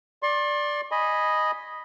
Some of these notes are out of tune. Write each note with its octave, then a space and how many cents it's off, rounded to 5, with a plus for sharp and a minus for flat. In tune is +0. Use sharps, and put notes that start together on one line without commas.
D5 +0 C6 +40
D#5 +0 G#5 -5 B5 -10